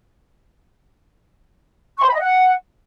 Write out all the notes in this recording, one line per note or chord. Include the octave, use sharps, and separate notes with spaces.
C#6
C5
B5
D#5
F#5